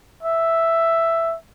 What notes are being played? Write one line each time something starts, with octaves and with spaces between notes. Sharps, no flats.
E5